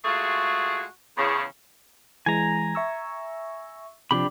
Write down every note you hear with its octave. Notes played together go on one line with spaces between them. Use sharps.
G#3 A3 F4 F#4 G#4
E2 C#3
E3 G#3 G#5 A#5
E5 C#6 E6
C3 F3 D4 G4 B5